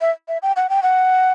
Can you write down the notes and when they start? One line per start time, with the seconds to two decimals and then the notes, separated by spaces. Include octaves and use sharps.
0.01 E5
0.28 E5
0.43 G5
0.56 F#5
0.70 G5
0.83 F#5